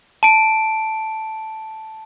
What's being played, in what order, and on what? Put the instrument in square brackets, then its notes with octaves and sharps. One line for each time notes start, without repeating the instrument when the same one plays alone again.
[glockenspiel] A5 D7